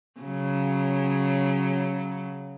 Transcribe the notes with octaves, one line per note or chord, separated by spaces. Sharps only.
C#3 F#3